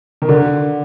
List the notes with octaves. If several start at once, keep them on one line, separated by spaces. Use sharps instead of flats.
D#3
D3